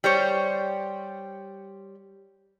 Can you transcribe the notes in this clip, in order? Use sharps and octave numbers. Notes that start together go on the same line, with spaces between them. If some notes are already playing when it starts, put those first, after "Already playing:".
G3 C5 C#5